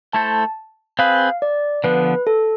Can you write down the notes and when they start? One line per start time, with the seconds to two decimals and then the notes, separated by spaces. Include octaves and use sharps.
0.13 A3 E4 A4 C5 A5
0.99 C4 G#4 B4 F5
1.42 D5
1.84 D3 F3 B3 B4
2.27 A4